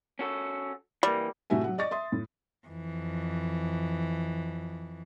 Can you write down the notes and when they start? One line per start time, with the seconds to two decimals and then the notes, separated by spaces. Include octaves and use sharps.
0.19 C#4 F#4 A4
1.03 E3 G3 A#3
1.50 A2 C3 A3 F#4 E5 G#5
1.64 F#3 F#5
1.78 D5 D#5 C#6 A6
1.91 E5 C6 D#6
2.12 A2
2.68 F2 E3